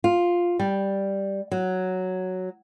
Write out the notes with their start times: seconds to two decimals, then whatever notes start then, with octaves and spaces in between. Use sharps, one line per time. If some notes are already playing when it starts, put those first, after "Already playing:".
0.04 F4
0.59 G3
1.51 F#3